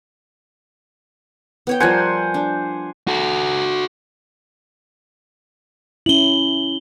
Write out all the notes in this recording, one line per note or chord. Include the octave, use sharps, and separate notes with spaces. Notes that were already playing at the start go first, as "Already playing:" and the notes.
B3 C#5 G5
F3 G3 A#4 C5 F#5 G#5
D4
F#4 A4
C#4 E4 F#7 G7